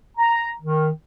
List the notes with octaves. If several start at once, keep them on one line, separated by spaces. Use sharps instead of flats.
A#5
D#3